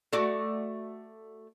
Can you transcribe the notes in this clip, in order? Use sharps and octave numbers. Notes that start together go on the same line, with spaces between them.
A3 F#4 D5